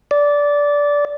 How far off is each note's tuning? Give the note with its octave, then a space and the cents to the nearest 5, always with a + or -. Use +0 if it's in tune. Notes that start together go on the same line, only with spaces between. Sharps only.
D5 -15